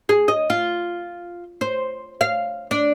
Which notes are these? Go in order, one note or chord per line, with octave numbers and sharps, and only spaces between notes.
G#4
D#5
F4
C5
F5
D4